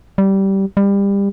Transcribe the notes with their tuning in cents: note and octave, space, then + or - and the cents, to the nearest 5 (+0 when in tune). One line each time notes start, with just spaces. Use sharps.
G3 -15
G3 +25